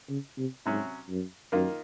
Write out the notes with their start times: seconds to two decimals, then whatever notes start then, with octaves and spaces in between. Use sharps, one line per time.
0.09 C#3
0.38 C3
0.66 G#2 C3 F#3 C#4
1.09 F#2
1.52 F#2 D#3 A#3 F4